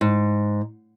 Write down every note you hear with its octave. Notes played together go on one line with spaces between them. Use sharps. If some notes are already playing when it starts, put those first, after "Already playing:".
G#2